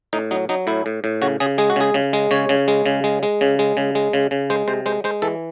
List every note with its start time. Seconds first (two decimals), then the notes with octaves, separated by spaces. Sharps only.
0.13 A2 D#4
0.31 F#3 D#4
0.49 F#3 D#4
0.67 A2 E4
0.86 A2
1.04 A2
1.22 C#3 F#4
1.40 C#3 G#4
1.58 G#3 G#4
1.70 F#4
1.76 C#3 G#4
1.94 C#3
2.13 G#3
2.31 C#3 C#5
2.49 C#3
2.68 G#3
2.86 C#3
3.04 G#3
3.23 G#3
3.41 C#3
3.59 G#3
3.77 C#3
3.95 G#3
4.13 C#3
4.31 C#3
4.50 G#3 C5
4.68 C3 C5
4.86 G#3 C5
5.04 G#3 C5
5.22 E3 A4